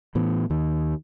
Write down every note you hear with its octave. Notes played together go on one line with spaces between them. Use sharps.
A2 E3 B3
D#2 D#3